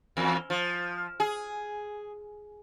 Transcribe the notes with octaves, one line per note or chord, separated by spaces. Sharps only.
E2
F3
G#4